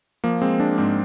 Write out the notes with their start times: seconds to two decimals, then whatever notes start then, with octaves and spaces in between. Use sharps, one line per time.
0.24 F3 A#3
0.42 G#3 C4
0.60 G#3 D4
0.78 G#2 C4